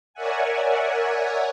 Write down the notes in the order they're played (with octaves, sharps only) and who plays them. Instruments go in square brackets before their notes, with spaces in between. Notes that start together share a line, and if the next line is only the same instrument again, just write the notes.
[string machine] A#4 C#5 D5 E5 F#5 G#5